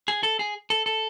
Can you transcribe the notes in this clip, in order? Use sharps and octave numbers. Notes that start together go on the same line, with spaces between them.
G#4
A4
G#4
A4
A4